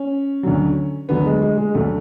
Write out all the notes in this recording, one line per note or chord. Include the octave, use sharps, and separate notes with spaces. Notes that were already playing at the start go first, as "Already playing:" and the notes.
Already playing: C#4
D2 D3 F#3
D2 D3 F#3 B3
G#3
G#3
G#3
D2 D3 F#3 A3